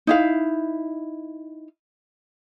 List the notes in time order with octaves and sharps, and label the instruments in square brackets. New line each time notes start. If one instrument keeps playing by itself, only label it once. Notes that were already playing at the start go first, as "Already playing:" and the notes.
[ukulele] D#4 E4 F5